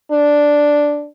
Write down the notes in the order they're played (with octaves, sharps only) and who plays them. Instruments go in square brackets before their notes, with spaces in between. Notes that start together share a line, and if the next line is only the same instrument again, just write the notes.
[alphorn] D4